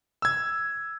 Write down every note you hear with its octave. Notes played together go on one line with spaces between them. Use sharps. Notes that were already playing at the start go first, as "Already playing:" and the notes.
E6 G#6